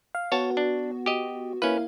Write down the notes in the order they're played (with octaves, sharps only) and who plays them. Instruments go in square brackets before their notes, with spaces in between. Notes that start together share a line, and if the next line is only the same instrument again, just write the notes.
[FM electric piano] F5
[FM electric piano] B3 F#4 [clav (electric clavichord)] C#5 A5
[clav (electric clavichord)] D4
G4 D#5
[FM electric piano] A#3 E4 F5 [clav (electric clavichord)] C#4 B4